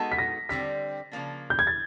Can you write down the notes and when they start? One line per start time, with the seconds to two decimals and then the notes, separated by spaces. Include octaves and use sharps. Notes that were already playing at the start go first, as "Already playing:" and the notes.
Already playing: G#3 B3 D#4 F#4 A4
0.12 B6
0.19 A#6
0.49 D3 G3 C4 B6
1.12 C#3 F3 A#3 D4
1.50 G6
1.59 G#6
1.67 A6